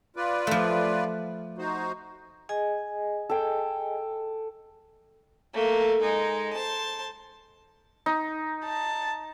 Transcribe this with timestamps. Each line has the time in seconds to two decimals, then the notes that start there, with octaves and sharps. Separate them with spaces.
0.16 F4 B4 D5
0.47 F3 A3
1.58 D#4 F#4 C5
2.49 G#4 D#5 G#5
3.30 A4 G5
5.53 A3 A#3
6.01 G#3 D#4
6.53 C5 A5
8.06 D#4
8.65 A5